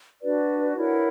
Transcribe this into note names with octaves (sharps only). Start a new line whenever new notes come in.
D4 F#4 B4 D5
E4 A#4 C#5 F#5